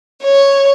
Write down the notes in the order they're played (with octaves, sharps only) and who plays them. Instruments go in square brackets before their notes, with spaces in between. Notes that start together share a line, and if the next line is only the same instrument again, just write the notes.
[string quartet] C#5